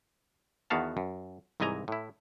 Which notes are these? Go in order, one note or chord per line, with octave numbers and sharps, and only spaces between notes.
E2 D#3 B3 F#4 F5 A5
F#2
C2 G#2 E3 D#5 G#5 A#5
A2 E4